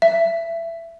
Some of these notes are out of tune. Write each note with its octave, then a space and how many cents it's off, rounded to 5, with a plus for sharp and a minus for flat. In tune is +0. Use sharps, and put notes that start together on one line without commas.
E5 +20